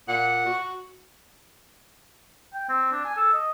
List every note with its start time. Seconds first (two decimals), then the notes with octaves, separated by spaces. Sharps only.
0.08 A#2 F#5
0.46 F#4
2.54 G5
2.69 C4
2.92 D4
3.05 G#5
3.16 A4
3.33 D#5